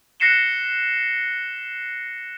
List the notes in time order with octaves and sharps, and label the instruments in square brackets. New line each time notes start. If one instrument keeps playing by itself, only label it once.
[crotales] F#6 A#6 C7 C#7 E7 G7